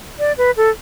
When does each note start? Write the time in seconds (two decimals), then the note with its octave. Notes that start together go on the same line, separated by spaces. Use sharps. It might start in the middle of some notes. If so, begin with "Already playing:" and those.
0.19 D5
0.38 B4
0.57 A4